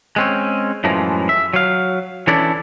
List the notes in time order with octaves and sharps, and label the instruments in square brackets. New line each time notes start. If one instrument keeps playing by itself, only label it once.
[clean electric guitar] G#3 C4 C#4
F#2 A2 E3 F3 G#3
E5
F#3 F5
E3 C#4 D4 E4 A4 D5